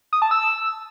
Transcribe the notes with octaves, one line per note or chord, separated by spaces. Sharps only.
D#6
A5
E6